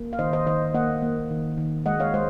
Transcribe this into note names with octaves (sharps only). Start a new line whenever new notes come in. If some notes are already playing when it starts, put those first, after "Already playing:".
Already playing: A#3
F5
D#3 C5 D#5
C5 D#5
D#3 C5 D#5
A#3 D#5 F#5
A#3
D#3
D#3
G#3 D#5 F#5
C#5 F5
G#3 C5 D#5